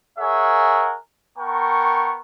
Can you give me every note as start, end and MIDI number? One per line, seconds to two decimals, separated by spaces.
0.19 0.95 68
0.19 0.95 70
0.19 0.95 73
0.19 0.95 76
0.19 0.95 78
0.19 0.95 80
1.38 2.19 59
1.38 2.19 70
1.38 2.19 79
1.38 2.19 81
1.38 2.19 85